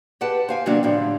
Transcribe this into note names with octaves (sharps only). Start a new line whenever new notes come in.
G4 G#4 B4 F#5 G5 A5
C5 F5 G#5
C3 D#3 F#3 A#3 B3 D4
A2 D3 F3 D4 G4